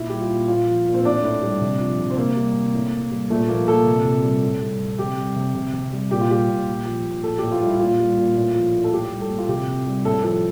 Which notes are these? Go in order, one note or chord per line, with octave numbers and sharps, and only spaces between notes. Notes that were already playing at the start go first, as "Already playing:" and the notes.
Already playing: A#2 E4
G3 G4
F4
A#2
A#2 F4
F3
A#2
C4
A2 D4
A2
G3
C3
F3
C3
C4
C3 A#3
G3
C3
A2
A2
G3
A#2 A3
F3 A#3
A#2 A4
C3
C3
G3
A2
G3
A2
C3 G4
G3
C3
C3
C3
G3
A#2 G4
F4
G3 G4
A#2
A#2
F3
A#2
A2 A4
A2 G4
F4
G3
E4
A#2 F4
G3
A#2
A2
F3
A2
A4
A2 G4
G3
A4
A2
F4
C3 G4
C3
G3
A2 A4
F3 A4